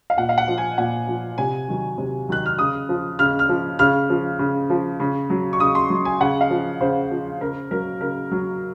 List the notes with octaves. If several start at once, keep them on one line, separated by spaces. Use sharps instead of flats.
F5
A#2 F#5
F5
F#5
F3
G#5
A#2 F#5
F3
C3 G#5
D#3 F#3
C3
D#3 F#3 F#6
F6
C#3 D#6
F3
C#3 F6
F6
F3
C#3 F6
F3
C#3
F3
C#3
F#3
C#6
C#3 D#6
C6
F#3
G#5
C#3 F#5
F5
F3
C#3 C5
F3
C#3 A#4
F#3 A#4
C#3 A#4
F#3